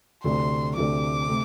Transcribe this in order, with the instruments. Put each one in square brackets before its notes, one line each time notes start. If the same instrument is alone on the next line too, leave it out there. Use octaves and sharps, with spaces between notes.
[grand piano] D2 C3 A3 D4 A4 [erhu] C6
[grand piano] D2 C3 A3 D4 A4 [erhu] D6
[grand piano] C3 A3